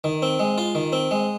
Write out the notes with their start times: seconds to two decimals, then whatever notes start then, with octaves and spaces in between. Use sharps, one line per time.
0.04 D#3
0.22 C4
0.39 G#3
0.58 F4
0.75 D#3
0.92 C4
1.11 G#3